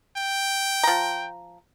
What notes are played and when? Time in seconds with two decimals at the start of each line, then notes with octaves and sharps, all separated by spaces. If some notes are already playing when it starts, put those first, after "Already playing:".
0.17 G5
0.83 F3 A#5